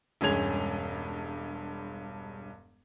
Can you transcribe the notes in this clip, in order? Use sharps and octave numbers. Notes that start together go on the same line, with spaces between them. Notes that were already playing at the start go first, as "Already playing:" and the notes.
E1 G2 G#3 C#4 G#6 F7